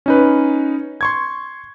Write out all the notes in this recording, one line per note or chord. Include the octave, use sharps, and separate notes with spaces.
C#4 D#4 B4
C6 C#6 G#6